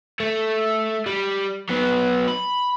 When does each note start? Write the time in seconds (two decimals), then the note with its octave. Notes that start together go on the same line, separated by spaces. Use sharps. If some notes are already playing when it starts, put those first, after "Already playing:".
0.20 A3
1.06 G3
1.69 F#3 B3
2.27 B5